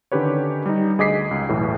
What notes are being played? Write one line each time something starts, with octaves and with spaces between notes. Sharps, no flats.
D3 D#3 C#4 G4 B4 C#5
G3 D#4
D2 G#4 D#5 D6 B6 C7
C#2
B1 E2 A2 E3